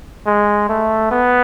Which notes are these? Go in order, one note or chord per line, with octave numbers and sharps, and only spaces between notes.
G#3
A3
B3